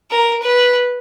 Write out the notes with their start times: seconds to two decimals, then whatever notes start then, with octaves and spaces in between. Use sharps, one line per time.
0.11 A#4
0.42 B4